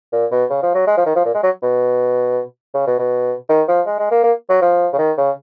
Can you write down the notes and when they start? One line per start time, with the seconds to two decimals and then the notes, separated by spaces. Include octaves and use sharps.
0.12 A#2
0.31 B2
0.50 C#3
0.62 F3
0.74 F#3
0.87 G#3
0.97 F3
1.06 D#3
1.15 F3
1.25 A#2
1.34 G#3
1.43 F#3
1.62 B2
2.74 C#3
2.87 B2
2.99 B2
3.49 D#3
3.68 F3
3.86 G#3
3.99 G#3
4.11 A#3
4.23 A#3
4.49 F#3
4.61 F3
4.93 C#3
4.98 D#3
5.18 C#3